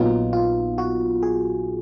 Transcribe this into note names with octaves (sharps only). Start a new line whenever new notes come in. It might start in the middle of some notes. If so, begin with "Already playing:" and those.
Already playing: A#1 A#2 F#3 B3 D#4 F4
F4
F#4
G#4